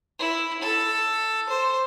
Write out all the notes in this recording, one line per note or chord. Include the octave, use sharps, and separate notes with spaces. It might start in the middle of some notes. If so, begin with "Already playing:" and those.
E4
A4
C5